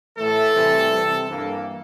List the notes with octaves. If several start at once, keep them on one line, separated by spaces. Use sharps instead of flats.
A2 E3 A3 A4
C3 E3 G3 C4
C3 G3 C4
G2 E3 A#3